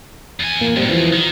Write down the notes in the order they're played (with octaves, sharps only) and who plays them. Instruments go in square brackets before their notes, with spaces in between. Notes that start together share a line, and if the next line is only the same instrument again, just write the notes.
[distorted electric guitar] E2 G#5
[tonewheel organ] A#2 A#3
[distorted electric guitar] F2 G#2 [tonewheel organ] G3 C4
[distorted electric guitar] E2 [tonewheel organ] E3 F3
[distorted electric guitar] D#3